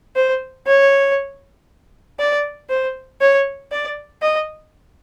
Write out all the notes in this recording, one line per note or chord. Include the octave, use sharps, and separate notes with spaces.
C5
C#5
D5
C5
C#5
D5
D#5